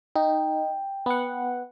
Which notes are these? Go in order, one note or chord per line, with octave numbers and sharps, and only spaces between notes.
D#4 G5
B3 F#5